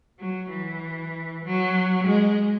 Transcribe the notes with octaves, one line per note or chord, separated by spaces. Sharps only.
F#3
E3
F#3
G#3